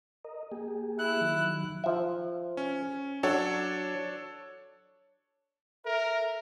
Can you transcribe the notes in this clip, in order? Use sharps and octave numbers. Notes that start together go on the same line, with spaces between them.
A#4 D#5
A#3 G4 G#4
E4 F#6
D#3 F#3
F3 E5
C#4
F#3 D4 A4 C#5
A4 A#4 E5